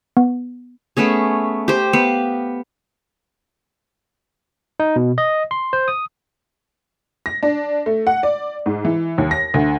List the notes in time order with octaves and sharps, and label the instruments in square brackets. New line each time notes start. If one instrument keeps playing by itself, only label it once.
[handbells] B3
[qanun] A3 B3 C#4 G#4
G4 C5
B3 F5
[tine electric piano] D#4
B2
D#5
C6
C5
D#6
[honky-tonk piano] A#6
D4
A3
F#5
D5
G#2
E3
D#2
A#6
D2